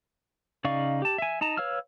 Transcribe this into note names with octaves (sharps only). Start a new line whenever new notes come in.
C#3 D#4 D5 F5 C#6
G4 A5
E5 G#5
D#4 A5 A#5
B4 C#5 F5 E6 F6